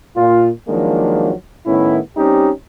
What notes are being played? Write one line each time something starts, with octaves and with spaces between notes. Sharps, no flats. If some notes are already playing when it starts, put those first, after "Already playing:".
A#2 F4
D#3 F3 F#3 G#3 A#3 D4
A2 D#3 B3 C#4 E4
G3 C4 C#4 D#4 G4